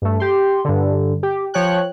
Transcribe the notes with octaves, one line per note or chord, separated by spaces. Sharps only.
G2 A3
G4 C6
G2 D3
G4
F3 C#5 G5 F#6